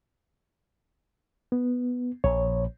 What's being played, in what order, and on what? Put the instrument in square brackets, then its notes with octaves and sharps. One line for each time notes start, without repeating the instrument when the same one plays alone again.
[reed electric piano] B3
[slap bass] A#1 [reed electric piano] C#5